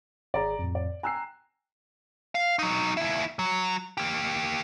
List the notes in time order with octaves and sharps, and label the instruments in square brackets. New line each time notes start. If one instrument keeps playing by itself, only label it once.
[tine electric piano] G#1 G#4 [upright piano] D5 A#5
[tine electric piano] F2 A2
[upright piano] D5
[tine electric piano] G5 A#5 F#6 [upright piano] G#5 E6 C7
[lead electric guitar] F5
F#3 D#4
D#2 E4
F#3
A#3 G4